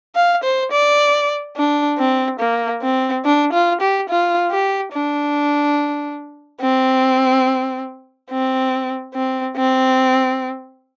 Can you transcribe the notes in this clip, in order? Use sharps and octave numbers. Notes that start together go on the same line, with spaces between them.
F5
C5
D5
D4
C4
A#3
C4
D4
F4
G4
F4
G4
D4
C4
C4
C4
C4